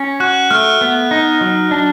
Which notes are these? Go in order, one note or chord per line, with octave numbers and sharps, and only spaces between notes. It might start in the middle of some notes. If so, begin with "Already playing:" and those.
Already playing: C#4
F#4 F#6
A3 F6
B3
D#4
F#3
D4